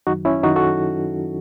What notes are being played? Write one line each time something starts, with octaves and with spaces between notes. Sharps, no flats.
F#2 D#3 F#3 D#4 F#4
C#4 E4
F#2 D#3 F#3 D#4 F#4
F#4 A4